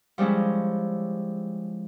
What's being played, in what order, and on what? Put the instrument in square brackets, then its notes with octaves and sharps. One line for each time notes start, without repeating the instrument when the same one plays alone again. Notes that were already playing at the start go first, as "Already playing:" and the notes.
[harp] F3 G3 G#3 C#4 E4